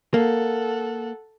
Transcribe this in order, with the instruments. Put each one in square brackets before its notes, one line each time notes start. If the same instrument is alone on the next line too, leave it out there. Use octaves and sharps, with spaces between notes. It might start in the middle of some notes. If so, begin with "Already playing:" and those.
[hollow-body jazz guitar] A#3 [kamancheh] A4 F#5